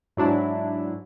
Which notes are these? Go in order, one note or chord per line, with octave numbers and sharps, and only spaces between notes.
G#2 F#3 D4 E4